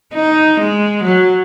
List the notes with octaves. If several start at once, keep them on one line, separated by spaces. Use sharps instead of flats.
D#4
G#3
F#3